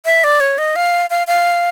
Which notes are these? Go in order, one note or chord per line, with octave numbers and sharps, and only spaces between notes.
E5
D5
C#5
D#5
F5
F5
F5